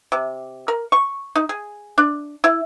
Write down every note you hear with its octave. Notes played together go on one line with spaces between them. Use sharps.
C3
A#4
C#6
D#4
G#4
D4
E4